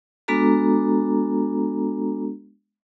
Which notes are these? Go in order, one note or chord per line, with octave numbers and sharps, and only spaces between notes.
G#3 B3 D4 F#4 A4 A#5